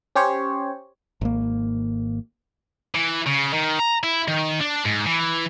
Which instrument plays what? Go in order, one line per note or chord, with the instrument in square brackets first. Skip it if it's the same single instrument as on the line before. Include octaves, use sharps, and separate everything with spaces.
[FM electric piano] C#4 G4 C5 C#5
[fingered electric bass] G#1 A#3
[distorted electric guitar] E3
C#3
D#3
A#5
E4
D#3
D4
G#2
E3